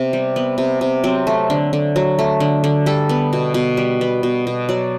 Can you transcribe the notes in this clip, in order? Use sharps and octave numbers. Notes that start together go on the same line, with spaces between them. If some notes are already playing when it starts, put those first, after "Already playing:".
Already playing: C3 B3
G3
B3
C3
C3
F#3 C4
A3
D3
D3
F#3
A3
D3
D3
G3 A4
B3
B2
B2
G3
B3
B2
B2
F#3 D5